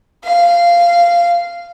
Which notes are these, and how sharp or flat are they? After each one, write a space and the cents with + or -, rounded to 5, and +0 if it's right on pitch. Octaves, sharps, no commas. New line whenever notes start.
F5 -10